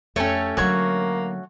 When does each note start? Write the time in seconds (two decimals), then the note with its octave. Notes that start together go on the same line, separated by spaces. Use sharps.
0.16 F2 A3 C#4 G4 A4 C#5
0.57 D3 F#3 A#3 F#4 C#5 C#6